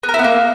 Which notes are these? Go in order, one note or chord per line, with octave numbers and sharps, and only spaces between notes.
B3
A#4
E4
B3
A#3